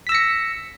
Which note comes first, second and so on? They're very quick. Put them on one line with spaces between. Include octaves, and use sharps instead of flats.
B6 E6 A#6 C#7